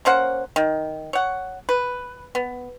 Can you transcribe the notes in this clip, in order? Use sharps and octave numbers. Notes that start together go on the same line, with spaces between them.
A#3 C#4 C5 F#5
D#3
C#5 F#5
B4
B3